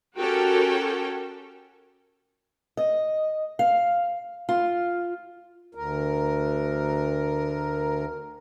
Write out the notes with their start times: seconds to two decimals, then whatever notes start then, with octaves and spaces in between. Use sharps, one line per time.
0.18 C#4 F#4 G4 A4 A#4 G5
2.77 D#5
3.59 F5
4.49 F4
5.75 D2 A#4